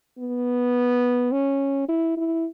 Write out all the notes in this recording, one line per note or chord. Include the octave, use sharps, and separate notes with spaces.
B3
C#4
E4
E4